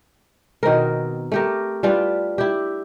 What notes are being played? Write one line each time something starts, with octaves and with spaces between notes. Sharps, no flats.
B2 D#3 C4 A#4
A3 G4 A#4
G3 D4 F4 B4
E4 G4